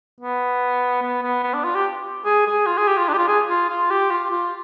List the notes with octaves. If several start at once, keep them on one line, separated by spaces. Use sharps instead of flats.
B3
B3
B3
B3
D4
F4
G4
G#4
G#4
F4
G#4
G4
F4
D4
G4
F4
G#4
F4
F4
G4
F4
F4